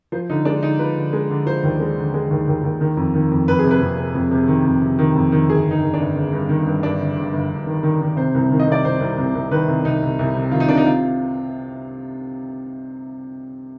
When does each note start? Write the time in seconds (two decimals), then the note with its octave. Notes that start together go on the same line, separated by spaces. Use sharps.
0.12 F3 C5
0.30 D3 D#4
0.45 G#3 D4
0.63 D3 D#4
0.79 F3 B4
0.96 D3
1.13 G#3
1.30 D3
1.46 F3 C5
1.63 D#2
1.80 G#3
1.97 D3
2.14 G#3
2.31 D#2
2.48 D#2
2.64 D#2
2.81 D#3
2.97 F2
3.14 D#3
3.31 F2
3.48 F2 B4
3.59 G#4
3.64 C3
3.71 B4
3.81 F2
3.97 C3
4.15 F2
4.31 C3
4.48 D#3
4.66 F2
4.82 C3
4.99 D#3
5.15 F2
5.32 D#3
5.49 G1 G#4
5.66 G1
5.71 D#4
5.83 D#3
5.94 D4
6.00 G1
6.15 G1
6.33 G2
6.49 D#3
6.66 G2
6.83 G2 D4
7.00 G1
7.17 G1
7.33 G1
7.50 G1
7.66 D#3
7.83 D#3
8.01 D#3
8.17 C3 C5
8.35 C2
8.51 D#3
8.60 D#5
8.68 C3 D5
8.84 C2 C5
9.01 C2
9.18 C2
9.35 C2
9.51 D#3 B4
9.68 C2
9.85 C2 D#4
10.02 C2
10.19 C2
10.35 C3
10.51 D#3 F4
10.60 D#4
10.69 C3 D4
10.77 D#4
10.86 F4